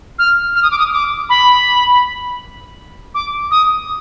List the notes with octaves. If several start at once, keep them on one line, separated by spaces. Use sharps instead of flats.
F6
F6
D#6
D6
D#6
D6
B5
D6
D#6